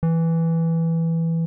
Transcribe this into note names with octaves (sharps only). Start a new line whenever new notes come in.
E3